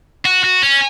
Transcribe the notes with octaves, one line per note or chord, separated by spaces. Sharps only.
F#4
F#4
C#4